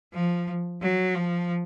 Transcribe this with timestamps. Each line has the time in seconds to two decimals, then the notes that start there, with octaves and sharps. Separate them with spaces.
0.14 F3
0.81 F#3
1.15 F3